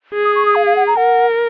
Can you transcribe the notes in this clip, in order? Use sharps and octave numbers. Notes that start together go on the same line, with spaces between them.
G#4
D#6
C#6
D#6
F5
F5
F#5
A#5
A#4 F#5